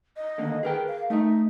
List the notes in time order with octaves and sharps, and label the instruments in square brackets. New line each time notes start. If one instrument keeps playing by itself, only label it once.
[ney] D#5
[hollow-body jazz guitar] D3 D#3 A#3
[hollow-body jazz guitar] G#4 A#4 G5 [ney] B4
[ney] F5
[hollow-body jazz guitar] A3 E5 [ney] D#4